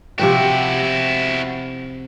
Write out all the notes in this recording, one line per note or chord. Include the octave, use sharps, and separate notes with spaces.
C3 F3 E4 F#4 G5